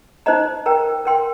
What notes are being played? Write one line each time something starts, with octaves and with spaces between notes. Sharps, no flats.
D#4 C5 D#5 A#5
A#4 G5 A#5
A#4 G5 C6